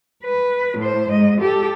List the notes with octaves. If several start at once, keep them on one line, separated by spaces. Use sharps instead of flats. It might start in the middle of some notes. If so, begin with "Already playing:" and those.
B4
A2 C5
G#2 D#5
G4 A4